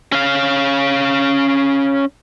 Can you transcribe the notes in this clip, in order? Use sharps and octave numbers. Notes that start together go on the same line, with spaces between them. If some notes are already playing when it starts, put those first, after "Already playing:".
C#4 F5